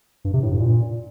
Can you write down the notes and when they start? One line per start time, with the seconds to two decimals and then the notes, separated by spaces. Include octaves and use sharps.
0.25 G2
0.33 C3
0.42 A2
0.51 G2
0.60 A#2